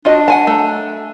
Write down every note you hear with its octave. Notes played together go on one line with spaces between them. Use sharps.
D4 F4 F#4 D#5
F#5 G#5 A5
A3 A#5